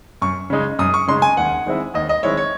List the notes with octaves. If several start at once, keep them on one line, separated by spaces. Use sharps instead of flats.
F#2 C#6
C#3 G#3 D#4
F#2 D#6
C#6
C#3 G#3 D#4 C6
G#5
D#2 F#5
D#3 G#3 C4 E4
D#2 D#5
D#5
D#3 G#3 C4 E4 C#5
C#5